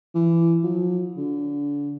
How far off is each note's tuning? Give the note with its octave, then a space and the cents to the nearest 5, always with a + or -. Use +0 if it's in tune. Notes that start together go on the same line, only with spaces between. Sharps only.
E3 +20
F3 +45
D3 -30